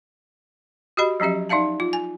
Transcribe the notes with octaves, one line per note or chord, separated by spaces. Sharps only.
F#4 G4 D#5 B5
F3 F#3 C#4 G4 E5
D#4 D5 E5 F5 A5
F4
G#5